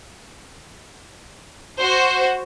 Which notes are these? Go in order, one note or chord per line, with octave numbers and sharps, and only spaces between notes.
F#4 C5